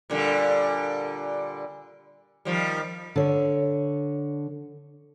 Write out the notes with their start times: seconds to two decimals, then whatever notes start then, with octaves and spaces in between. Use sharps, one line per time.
0.10 A#2 D3 G3
2.45 D#3 F3 G3
3.16 D3 C#5